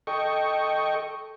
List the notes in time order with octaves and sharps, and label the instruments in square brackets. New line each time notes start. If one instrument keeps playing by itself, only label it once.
[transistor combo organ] A4 D#5 G5 C#6